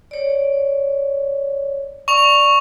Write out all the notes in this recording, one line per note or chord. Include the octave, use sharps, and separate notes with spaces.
C#5 D5
D5 C#6 F7